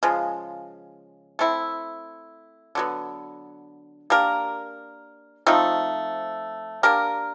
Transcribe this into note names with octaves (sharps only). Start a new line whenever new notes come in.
C#3 F3 G#3
A3 C4 E4
D3 F#3 B3
A#3 D4 G4 A#4
F3 A3 C4 D#4
A#3 D4 G4 A#4